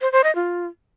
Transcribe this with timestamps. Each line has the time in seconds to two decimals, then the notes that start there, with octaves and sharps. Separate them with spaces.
0.01 C5
0.12 C5
0.24 D#5
0.35 F4